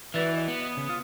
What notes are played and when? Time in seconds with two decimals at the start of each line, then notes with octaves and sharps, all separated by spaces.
0.14 E3 F#4 B4 D5 E5
0.35 D#5
0.48 B3
0.63 D#6
0.77 C#3
0.89 F4